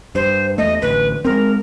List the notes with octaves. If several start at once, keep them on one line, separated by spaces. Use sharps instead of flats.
G2 C5
E2 A3 D#5
A1 D2 B4
G#3 B3 C4 A#4